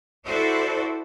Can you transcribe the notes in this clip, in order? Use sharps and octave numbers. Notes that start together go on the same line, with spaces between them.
E4 F#4 A4 C5 D5 E5